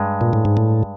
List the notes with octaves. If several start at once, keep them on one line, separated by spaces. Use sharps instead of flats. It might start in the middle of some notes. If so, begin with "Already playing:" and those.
Already playing: G2 G#3
A#2
A2
G#2
A2